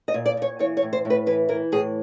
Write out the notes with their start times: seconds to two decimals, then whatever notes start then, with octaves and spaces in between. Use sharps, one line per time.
0.08 D#5
0.14 A#2
0.26 D5
0.37 A#2 C#5
0.59 E3 C#5
0.77 C#5
0.82 A2
0.93 C5
1.05 A2
1.10 B4
1.26 E3 B4
1.49 E3 A#4
1.72 A2 G#4